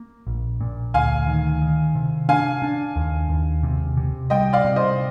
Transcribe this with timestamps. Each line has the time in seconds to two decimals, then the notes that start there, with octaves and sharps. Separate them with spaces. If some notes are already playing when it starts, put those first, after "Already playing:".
Already playing: A#3
0.27 A#1
0.61 A#2
0.94 D2 F5 G#5
1.27 D#3
1.61 D#3
1.95 C3
2.29 D4 F5 G#5
2.62 D4
2.96 D#2
3.29 D#2
3.63 C3
3.97 C3
4.30 G3 D#5 G5
4.53 D5 F5
4.64 C3
4.76 C5 D#5